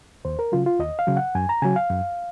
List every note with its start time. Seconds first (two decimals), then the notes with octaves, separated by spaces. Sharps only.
0.25 D#2 C5
0.39 A#4
0.52 C#3 F#3 F4
0.66 F4
0.80 D#2 D#5
0.99 F5
1.07 C#3 F#3
1.17 F#5
1.35 F#2 G#5
1.49 A#5
1.62 C#3 F#3 G#5
1.76 F5
1.90 F#2